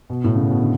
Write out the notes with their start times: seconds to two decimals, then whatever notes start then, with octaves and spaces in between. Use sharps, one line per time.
0.10 B2
0.24 A2
0.35 C#3
0.39 B2
0.50 B2
0.60 D3